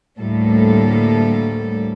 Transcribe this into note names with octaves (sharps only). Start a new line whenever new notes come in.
D2 A2 G3 A#3 A4